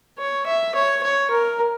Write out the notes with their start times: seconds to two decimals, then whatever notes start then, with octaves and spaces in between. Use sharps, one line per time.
0.18 C#5
0.46 E5
0.75 C#5
1.03 C#5
1.31 A#4